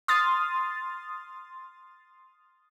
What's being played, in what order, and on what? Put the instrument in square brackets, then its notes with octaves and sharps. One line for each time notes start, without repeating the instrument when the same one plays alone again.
[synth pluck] C6 D#6 F6 A6